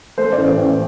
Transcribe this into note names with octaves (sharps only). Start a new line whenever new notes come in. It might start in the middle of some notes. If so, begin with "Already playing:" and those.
A3 C5
D5
A1
C5
A1